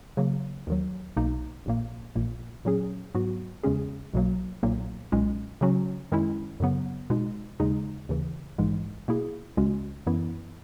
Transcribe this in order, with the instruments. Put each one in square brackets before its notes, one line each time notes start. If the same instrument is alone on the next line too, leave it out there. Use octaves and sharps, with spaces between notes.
[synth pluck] C#3 F#3 A#3
D#2 D#3 F#3
B1 B2 A#3 D#4
A#1 A#2 A#3
A#1 A#2 A#3
A#2 F#3 C#4 G#4
G#2 F#3 B3 F#4
E2 C#3 G#3 C#4 G#4
B1 B2 F#3 A#3
B1 A#2 F#3 A#3
B1 A#2 G#3 C#4
C#3 F#3 C#4 F#4
F#2 D#3 G#3 C#4 E4
F#2 C#3 F#3 B3
B2 G#3 D#4
D#2 C#3 G#3 D#4
D#2 C#3 E3
A#1 G#2 E3 G#3
B2 A#3 E4 G#4
C#2 C#3 G#3 C#4 F#4
F#2 E3 B3 E4